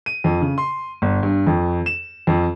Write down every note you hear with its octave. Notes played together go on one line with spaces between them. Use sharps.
D#7
F2
C#3
C6
G1
G2
F2
E7
F2